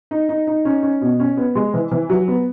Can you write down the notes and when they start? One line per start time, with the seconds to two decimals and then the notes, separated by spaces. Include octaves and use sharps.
0.11 D#4
0.29 D#4
0.47 D#4
0.65 C#4
0.83 C#4
1.01 B2
1.20 C#4
1.37 B3
1.55 G#3
1.74 E3
1.91 E3
2.10 F#3
2.28 B3